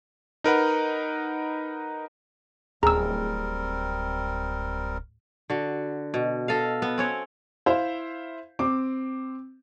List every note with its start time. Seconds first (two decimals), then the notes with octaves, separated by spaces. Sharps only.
0.44 D#4 A#4 B4 F#5
2.83 D1 G3 C4 G#4 A#4 A#5 E6
5.50 D3 F#4
6.14 B2
6.48 A4 D#5 F5
6.82 B3
6.98 C4 C#4 C#5
7.66 E4 C5 E5 F5
8.59 C4 D6